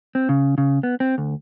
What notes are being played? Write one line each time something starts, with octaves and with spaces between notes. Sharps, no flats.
C4
C#3
C#3
B3
C4
D2